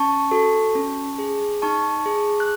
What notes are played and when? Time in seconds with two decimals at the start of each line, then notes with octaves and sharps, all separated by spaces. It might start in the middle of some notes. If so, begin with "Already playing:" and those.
Already playing: C#4 A5 C#6
0.31 F#4 A4
0.75 C#4
1.19 G#4
1.62 D#4 A5 C#6
2.06 G#4
2.40 F#6